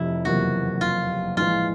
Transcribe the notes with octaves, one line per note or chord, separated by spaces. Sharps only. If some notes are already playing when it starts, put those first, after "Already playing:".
Already playing: F1 F2 C3 E4
F#1 E2 C3 F3 A#3 F#4
F4
A#1 A2 E3 G#3 F4